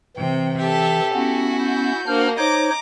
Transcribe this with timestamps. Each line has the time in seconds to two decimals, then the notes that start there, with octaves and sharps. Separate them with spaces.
0.17 C3 E3 G5
0.59 G4 A4 E5
1.13 B3 C#4 E4 F#4
1.62 G6
2.07 A#3 D4 F#4 C5 F6
2.38 D#4 C5 C#5 D#5 A#5 D6